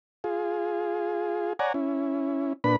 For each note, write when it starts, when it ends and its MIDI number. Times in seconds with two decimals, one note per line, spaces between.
0.24 1.53 65
0.24 1.53 68
1.59 1.73 73
1.59 1.73 74
1.59 1.73 78
1.59 1.73 80
1.59 1.73 82
1.74 2.53 61
1.74 2.53 64
2.64 2.76 46
2.64 2.76 62
2.64 2.76 71
2.64 2.76 83